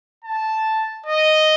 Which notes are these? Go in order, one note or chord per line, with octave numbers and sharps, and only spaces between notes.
A5
D#5